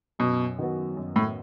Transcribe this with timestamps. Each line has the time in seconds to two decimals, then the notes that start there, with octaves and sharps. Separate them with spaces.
0.19 F#2 B2
0.59 D#3 F#3 B3 F#4
0.97 F#2
1.16 A2